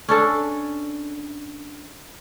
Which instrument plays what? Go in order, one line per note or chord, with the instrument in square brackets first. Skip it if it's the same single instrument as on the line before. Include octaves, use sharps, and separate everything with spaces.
[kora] C#4 D4 A4